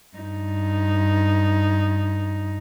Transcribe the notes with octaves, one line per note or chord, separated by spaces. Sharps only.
G2 D#4